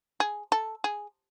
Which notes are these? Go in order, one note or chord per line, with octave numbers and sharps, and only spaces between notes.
G#4
A4
G#4